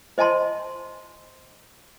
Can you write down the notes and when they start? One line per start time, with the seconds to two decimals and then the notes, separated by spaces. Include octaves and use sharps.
0.18 C5 D#5 G#5 A5 C6